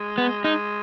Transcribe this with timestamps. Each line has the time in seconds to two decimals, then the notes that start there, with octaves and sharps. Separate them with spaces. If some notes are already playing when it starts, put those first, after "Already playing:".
Already playing: G#3
0.18 B3
0.44 G#3 D#4